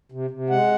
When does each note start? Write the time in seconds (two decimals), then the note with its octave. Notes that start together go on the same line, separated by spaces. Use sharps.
0.12 C3
0.30 C3
0.50 G#3 F#5